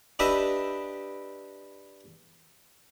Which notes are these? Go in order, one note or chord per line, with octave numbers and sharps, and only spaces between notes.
D4 G4 B4 D#5 E5